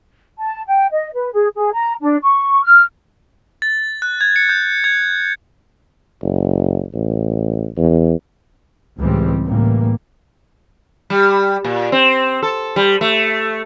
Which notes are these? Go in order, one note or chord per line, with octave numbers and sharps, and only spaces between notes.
A5
G5
D#5
B4
G#4
G#4
A#5
D4
C#6
F6
A6
F#6
G#6
C#7
G6
G#6
F#1
A1
E2
C#2 A2 E3 G3 G#3 C4
A2 C#3 E3 G3 A#3
G3
A#2
C4
A4
G3
A3